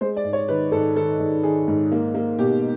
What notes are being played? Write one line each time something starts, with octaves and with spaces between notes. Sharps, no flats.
G#3 C5
D5
G#2
C#5
D#3 B4
G#2 A4
D#3 A4
G#2
D#3 G#4
G#2
A#3
A#3
B2 G4